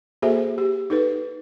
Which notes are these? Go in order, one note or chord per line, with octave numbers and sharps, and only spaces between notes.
A#3 F#4 G#4 A4 C5 E5
G4
D#4 A4 B4